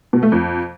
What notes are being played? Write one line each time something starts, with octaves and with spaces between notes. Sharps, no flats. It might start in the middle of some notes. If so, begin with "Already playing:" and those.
B2
A3
F2